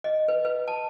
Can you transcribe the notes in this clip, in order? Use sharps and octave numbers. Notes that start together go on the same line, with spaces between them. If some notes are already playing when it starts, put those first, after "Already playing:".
D#5
B4
B4
A5